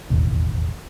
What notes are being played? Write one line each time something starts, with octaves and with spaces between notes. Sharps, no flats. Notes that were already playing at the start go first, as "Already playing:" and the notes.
E1 A1 D#2